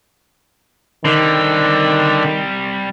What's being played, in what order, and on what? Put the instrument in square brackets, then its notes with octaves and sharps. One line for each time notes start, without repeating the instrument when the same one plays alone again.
[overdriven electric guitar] D3 [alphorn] D#3 [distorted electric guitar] G3 C4